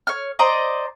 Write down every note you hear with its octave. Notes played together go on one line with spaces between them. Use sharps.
C#5 F6
C5 D5 D#5 A#5